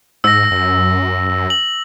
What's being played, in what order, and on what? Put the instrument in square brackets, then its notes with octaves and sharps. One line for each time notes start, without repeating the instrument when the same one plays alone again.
[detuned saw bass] G#2 [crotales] E6 A#6
[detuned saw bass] F#2
[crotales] F#7